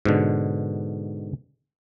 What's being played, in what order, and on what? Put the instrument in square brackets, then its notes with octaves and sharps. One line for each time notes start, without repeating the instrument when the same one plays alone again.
[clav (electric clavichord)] G#2 B2 D3